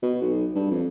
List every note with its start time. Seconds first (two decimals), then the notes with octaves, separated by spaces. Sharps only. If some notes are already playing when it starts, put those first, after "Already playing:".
0.02 B2
0.22 B1
0.55 G2
0.70 F2